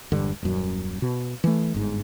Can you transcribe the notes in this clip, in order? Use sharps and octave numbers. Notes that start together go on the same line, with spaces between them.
E1 G2 D3
D#1 F#2
B2
E3 A3
G1 G#2